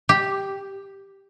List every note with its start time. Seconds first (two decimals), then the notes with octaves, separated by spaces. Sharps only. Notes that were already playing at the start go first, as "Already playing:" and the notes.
0.09 G4